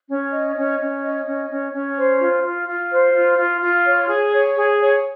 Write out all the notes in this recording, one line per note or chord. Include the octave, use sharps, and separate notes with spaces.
C#4
D#5
C#4
C#4
D#5
C#4
C#4
C#4
C5
F4
F4
F4
C5
F4
F4
F4
C#5
G#4
C#5
G#4
C#5